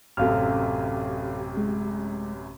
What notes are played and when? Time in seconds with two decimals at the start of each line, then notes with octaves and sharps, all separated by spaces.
0.17 A1 F#2 C3 A4 F5 F6
1.57 G#3